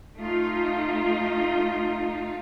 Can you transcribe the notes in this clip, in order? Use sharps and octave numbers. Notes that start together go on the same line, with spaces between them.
A3 D#4 F4